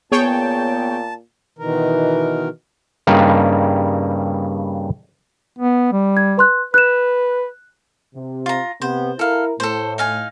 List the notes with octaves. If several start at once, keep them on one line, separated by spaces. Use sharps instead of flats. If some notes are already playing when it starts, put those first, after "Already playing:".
A#2 B3 G#4 C#5 G5 A5
B2 D#3 E3 A#4
G2 C#3 G3 A#3 D#4
B3
G3
G#6
B4 C6 F#6
B4 F#6 E7
C3
F4 A#5
C3 B3 C5
E4 A4 A#4 F5
A2 A4 C5
D#4 F5 G#5